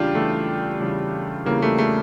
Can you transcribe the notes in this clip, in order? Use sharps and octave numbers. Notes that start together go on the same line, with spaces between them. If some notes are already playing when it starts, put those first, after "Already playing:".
Already playing: E2 C#3 G3 D4 F4 G4
E2 C#3 G3 A3
E2 C#3 G3
E2 C#3 G3 A#3
A3
A3